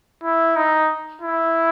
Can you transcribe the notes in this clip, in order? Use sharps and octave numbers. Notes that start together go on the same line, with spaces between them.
E4
D#4
E4